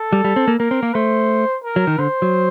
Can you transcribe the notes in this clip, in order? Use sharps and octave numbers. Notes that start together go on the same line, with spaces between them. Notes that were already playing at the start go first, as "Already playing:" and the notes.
Already playing: A4
G3
G3
C4
A#3
A#3 A#4
C4
A#3
A3 C5
A#4
F#3
D#3
D3 C5
F#3